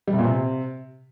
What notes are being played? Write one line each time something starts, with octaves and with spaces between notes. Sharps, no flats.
G3
C3
A#2
C3